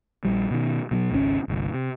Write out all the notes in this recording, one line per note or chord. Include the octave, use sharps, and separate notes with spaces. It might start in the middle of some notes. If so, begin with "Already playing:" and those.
A#1 G3
B2 D#3
B2 F3 F#3
G#1 C#2 C3 C#4
G1 C2
C3